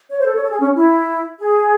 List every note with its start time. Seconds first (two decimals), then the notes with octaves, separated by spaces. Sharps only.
0.11 C#5
0.19 C5
0.27 A4
0.35 C#5
0.43 A4
0.51 G#4
0.60 C#4
0.75 E4
1.39 G#4